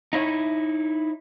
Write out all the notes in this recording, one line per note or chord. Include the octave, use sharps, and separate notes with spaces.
D#4 E4 C#5